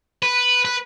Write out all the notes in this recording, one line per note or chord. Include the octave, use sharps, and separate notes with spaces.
B4
B4